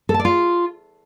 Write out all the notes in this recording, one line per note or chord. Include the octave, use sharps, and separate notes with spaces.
A4
A5
D5
F4